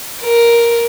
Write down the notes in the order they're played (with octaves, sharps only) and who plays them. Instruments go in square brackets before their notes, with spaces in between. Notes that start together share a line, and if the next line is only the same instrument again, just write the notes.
[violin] A#4